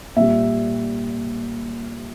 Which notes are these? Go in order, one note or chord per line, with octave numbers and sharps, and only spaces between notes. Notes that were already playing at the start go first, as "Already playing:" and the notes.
A#2 G3 E5